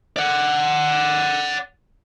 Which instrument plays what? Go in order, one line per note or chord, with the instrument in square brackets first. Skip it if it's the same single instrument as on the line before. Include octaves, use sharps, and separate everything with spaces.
[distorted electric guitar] D5 F#5